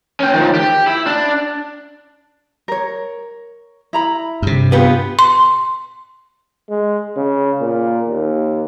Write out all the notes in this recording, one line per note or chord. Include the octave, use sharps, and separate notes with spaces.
C#4 G5
D#3 F3
G4
E4
D4
A#4 C#5
E4 A#5 B5
G2 C3
B3 F4 G4 G#4 B4
C6
G#3
C#3
A#2
D#2